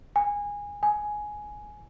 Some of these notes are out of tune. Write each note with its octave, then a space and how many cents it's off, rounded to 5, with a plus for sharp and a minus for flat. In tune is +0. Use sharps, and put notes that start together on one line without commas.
G#5 -20
G#5 +10